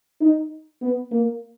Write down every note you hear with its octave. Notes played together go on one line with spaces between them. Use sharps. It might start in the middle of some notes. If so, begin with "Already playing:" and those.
D#4
B3
A#3